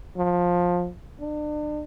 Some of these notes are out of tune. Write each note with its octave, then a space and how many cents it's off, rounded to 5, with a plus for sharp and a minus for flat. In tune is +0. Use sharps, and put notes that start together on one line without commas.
F3 +20
D4 +40